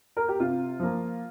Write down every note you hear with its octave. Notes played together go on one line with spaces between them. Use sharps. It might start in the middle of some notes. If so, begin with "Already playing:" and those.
A#4
G4
C3 F4
F3 A#3